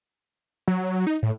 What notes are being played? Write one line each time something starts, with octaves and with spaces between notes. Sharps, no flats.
F#3
D#4
A2